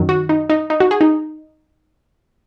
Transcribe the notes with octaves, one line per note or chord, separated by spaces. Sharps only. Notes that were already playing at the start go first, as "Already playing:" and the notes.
Already playing: F#2 D#3 F#3
F#4
D#4
D#4
D#4
F#4
G#4
D#4